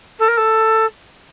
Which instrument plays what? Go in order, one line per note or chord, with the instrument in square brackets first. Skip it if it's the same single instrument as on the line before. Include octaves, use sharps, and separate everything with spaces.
[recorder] A4
A#4
A4